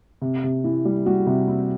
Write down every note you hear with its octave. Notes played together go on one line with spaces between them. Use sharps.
C3
C3
E3
G3
G3 F#4
C3
C4